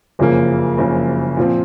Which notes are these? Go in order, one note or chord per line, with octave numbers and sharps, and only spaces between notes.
F#1 F2 C#3 F3 A#3
F#1 F2 C#3 F3 A#3
A#2 F3 C4